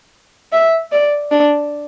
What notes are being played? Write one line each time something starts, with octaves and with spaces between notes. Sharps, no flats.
E5
D5
D4